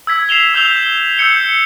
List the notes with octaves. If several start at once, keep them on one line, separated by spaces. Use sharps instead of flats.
E6 G#6 B6
C7 E7 F7 G7
E6 G6 F7 G7
E6 G6 C#7 G7